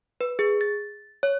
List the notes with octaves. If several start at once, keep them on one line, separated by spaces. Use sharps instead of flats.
B4
G#4
A6
C#5